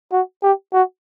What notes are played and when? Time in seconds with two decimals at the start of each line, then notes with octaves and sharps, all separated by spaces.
0.12 F#4
0.42 G4
0.73 F#4